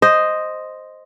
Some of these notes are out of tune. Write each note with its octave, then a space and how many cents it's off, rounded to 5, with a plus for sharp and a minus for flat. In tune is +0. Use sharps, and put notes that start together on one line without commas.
C5 +0 D#5 +0